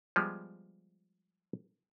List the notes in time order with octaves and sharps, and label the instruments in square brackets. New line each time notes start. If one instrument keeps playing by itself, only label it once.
[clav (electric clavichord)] F3 G3 G#3 B3